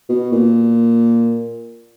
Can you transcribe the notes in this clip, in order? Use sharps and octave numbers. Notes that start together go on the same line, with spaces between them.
B2
A#2